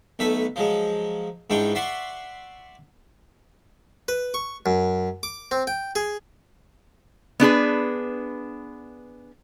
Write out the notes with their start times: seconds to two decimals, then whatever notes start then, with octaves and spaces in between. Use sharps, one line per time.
0.19 B1 A3 B4 E5
0.56 F3 F#3 G#3
1.50 G#2 E3 D4 F4 G5 C#6
1.75 D5 E5 F#5 C6 C#6
4.08 B4
4.34 C#6
4.66 F#2
5.23 D6
5.51 C4
5.67 G5
5.96 G#4
7.40 B3 D4 G#4 B4